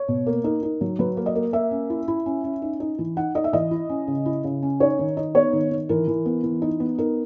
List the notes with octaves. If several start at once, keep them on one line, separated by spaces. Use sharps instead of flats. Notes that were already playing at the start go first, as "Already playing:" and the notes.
Already playing: C#5
B2
A#3
D#4 A#4
D#4
F#3
F#3 B4
A#3
D#5
A#3
A#3 E5
C#4
E4
E4
C#4
C#4
D#4
D#4
E3
D#4 F#5
D#4 D#5
E5
E3 D#5
E4
C#4
C#3
E4
C#3
C#4
D#4 C#5
D#3
D#4
B3 C#5
D#3
D#3
E3 A#4
E3
B3
E3
D#4
B3
D#4 A#4